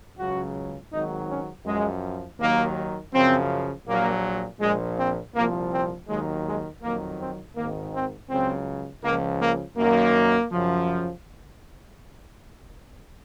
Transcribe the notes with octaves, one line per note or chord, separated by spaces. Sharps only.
C#2 C#3 F#3 F#4
G#1 G#2 D#3 F#3 D#4
C#4
F#2 F3 G#3
D#2 D#3 F#3 A#3
F#2 C#3 F3 C4
A#1 A#2 F#3 A#3
A#1 A#2 F3 G#3
C4
C2 A#2 F3 A#3
C4
D#2 D#3 F#3 G#3
G#3
F2 D#3 F#3 A#3
C4
G#1 G#2 D#3 A#3
C4
C#2 C#3 F#3 C4
C#2 C#3 F3 A#3
A#3
F#2 D#3 F#3 A#3
F#2 C#3 F3